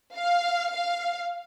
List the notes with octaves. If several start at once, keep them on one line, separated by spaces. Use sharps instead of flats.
F5
F5